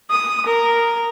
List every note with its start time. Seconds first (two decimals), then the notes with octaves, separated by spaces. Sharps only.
0.10 D#6
0.46 A#4